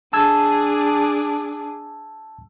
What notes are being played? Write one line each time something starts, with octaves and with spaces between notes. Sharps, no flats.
D4 G#4 A5 E6 G#6